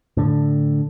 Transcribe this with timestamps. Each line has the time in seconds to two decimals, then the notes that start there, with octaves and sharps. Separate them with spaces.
0.17 A2 D3